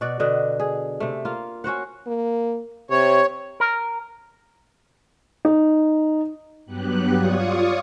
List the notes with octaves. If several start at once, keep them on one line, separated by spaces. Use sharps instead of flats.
B2 F#4 D5 F#5
B2 D3 D4 D#5
G#4
C3 A3
A#3 F4
C#4 F#4 C5 F#5
A#3
C3 C#5
A#4
D#4
G2 F#3 B3 G4 F#6
F4 C#5 D5 F5 C#6 D#6